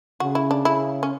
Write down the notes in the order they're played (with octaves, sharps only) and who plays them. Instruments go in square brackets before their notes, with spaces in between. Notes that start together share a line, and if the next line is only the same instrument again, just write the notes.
[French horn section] C#3 [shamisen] F#4
[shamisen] E4
D4
[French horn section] C#3 [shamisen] E4
[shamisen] C#4